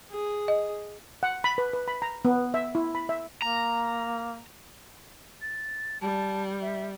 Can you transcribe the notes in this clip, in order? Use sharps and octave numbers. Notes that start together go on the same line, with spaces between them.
G#4
D#5
F#5
B5
B4
B4
B5
A#5
B3
E5
E4
B5
E5
A#3 A#5
A6
G3 A5
E5